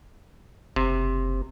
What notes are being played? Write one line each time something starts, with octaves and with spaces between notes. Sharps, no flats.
F#1 C3